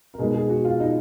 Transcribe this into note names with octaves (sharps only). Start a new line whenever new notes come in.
A#4
B2 G#3 D#4 G#4
G#4
F#4
F4
D#4